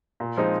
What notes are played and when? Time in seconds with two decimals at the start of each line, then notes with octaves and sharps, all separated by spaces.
0.20 A#2
0.37 F3 G#3 C4 D#4